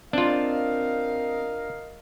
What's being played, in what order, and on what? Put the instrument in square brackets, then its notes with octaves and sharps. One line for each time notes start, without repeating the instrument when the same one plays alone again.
[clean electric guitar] C4 [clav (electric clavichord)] D4 F4 [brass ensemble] A#4 D#5 F5